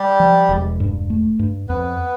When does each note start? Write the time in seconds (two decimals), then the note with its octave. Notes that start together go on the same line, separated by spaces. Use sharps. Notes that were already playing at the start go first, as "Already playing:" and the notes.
Already playing: G3 G4
0.20 F3
0.49 E1
0.80 G2
1.10 A3
1.39 G2
1.69 F2 B3 B4